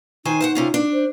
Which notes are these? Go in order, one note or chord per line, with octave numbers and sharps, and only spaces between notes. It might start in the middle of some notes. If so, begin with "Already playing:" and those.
D#3 D#4 C5 G#5
C5 F5 F#5
C3 C#4 F4
D4
C5